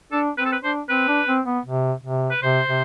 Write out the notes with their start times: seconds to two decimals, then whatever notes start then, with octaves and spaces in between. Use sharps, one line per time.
0.12 D4 A4
0.38 C4 B4
0.46 A4
0.52 B4
0.64 D4 C5
0.89 C4 B4
1.08 D4
1.27 C4
1.46 B3
1.66 C3
2.04 C3
2.31 B4
2.42 C3 C5
2.68 C3